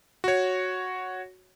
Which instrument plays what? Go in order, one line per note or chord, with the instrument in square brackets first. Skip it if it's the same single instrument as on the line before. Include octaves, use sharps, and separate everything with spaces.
[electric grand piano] F#4 C#5